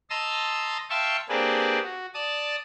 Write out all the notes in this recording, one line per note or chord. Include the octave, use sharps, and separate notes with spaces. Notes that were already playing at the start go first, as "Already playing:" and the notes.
D#5 A5 A#5 C6 D#6 E6
E5 F5 G5 A5 C6 C#6
A#3 C4 D4 G4 G#4 B4
F#4
D5 A5 D#6